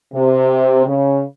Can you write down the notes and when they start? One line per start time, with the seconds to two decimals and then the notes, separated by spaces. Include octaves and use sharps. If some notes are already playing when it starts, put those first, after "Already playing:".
0.14 C3
0.85 C#3